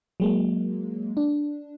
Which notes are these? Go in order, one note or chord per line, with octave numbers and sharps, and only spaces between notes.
F#3 G#3 A#3
D4